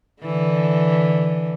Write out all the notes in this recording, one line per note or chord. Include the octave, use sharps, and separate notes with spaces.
D3 E3